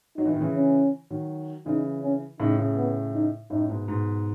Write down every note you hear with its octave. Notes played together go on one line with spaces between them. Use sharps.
F#3 D#4
E3
D#3
C#3 E3
C#4
D#3 F#3
C#3 E3 D#4
C#4
A2 C#3 D#4
A2 C#3
B3
D#4
F#2 A2 D#4
G#2 B2
G#2 B2